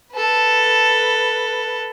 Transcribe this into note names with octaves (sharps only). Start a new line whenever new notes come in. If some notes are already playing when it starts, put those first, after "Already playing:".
A4 B4